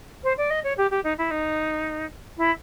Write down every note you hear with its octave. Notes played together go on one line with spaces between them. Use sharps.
C5
D5
D#5
C#5
G4
G4
D#4
E4
D#4
E4